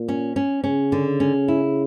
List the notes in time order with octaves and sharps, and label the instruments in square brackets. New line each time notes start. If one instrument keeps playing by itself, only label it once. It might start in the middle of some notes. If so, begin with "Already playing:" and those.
Already playing: [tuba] A#2
[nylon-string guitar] C#4
C#4
[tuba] C#3 [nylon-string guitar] C#4
[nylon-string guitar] D3
C#4
E4